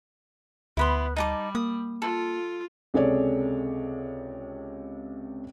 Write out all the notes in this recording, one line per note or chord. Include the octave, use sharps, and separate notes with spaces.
D2 B3 E4 B5 C6
G3 D#4 A5 D6
A#3 D#6
F4 A4
C#2 C3 G#4 A4 C#5 D5